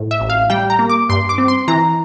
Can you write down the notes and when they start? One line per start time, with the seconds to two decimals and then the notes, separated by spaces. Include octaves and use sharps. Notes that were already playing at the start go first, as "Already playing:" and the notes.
Already playing: A2
0.11 E5
0.20 A1
0.30 F5
0.50 G3 G5
0.70 A#5
0.79 A#3
0.90 D6
1.09 G2 C6
1.29 D6
1.38 C4
1.48 C6
1.68 E3 A#5